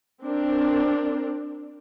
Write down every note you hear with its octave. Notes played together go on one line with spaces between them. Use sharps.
C4 D4 A#4